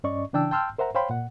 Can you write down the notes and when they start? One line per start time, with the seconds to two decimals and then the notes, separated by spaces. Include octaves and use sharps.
0.04 G2 C#4 D5 D#5 C#6
0.33 C#3 E3 D4 G5 A5 E6
0.51 G5 A5 C6 E6 F6 G6
0.78 A#4 C5 E5 F#5 A#5
0.95 C5 C#5 F5 G5 B5 C6
1.10 A#2 F#5